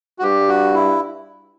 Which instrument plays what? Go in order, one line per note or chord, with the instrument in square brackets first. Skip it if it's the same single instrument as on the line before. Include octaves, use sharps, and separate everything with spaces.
[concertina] F#4
[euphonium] G2 [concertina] G4
[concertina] F#4
E4